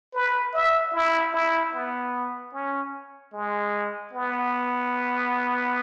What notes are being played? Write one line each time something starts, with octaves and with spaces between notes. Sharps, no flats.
B4
E5
E4
E4
B3
C#4
G#3
B3